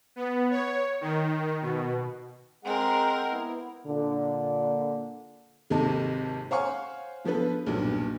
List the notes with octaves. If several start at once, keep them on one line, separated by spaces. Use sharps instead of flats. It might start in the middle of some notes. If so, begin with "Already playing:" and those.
B3
C#5
D#3
B2
G#3 C4 G#4 A#4 F#5
B3 E4
A#2 D3
G#1 D#2 C3 A4 D#5 A5
C5 C#5 F5 F#5 G#5 C#6
D3 F3 B3 A4 B4
B1 E2 G2 A#2 F#3